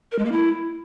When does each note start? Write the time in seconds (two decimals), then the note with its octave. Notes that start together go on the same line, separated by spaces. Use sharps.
0.12 A#4
0.19 G#3
0.25 A#3
0.32 E4